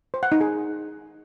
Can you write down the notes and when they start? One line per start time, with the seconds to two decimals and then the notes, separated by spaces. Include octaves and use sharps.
0.14 C5
0.23 F#5
0.32 D#4
0.41 G#4